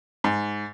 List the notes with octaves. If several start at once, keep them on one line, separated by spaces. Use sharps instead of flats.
G#2